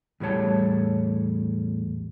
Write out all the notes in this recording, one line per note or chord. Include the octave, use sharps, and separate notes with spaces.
E2 A2 G3 C#5 A5